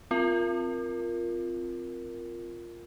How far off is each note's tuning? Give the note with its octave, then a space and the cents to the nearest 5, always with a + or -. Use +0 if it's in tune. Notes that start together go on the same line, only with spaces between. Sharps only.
C4 +0 F4 +0 A#4 +0